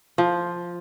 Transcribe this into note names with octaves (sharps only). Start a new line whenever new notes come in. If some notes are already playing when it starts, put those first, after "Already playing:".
F3